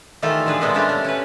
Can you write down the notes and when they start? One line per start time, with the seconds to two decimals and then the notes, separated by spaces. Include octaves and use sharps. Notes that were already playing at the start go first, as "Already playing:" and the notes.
0.22 D#3 E3 A3 F4 G4 A4
0.46 D3 F3 G#4 B4
0.61 A#2 G#3 A3 B3 C4
0.74 G3 A3 C#4 D4 G4 F5
0.89 A3
1.04 C#4 B4